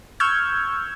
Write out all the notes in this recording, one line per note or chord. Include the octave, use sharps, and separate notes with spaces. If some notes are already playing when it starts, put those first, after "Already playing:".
C#6 E6 F6 G6 G#6